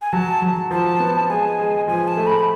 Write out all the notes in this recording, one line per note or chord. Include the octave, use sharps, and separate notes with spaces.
G#5
F#3 A5
F#3
F3 A5
B3
G#3 G#5
G#3
F3 G#5
A5
A3
B5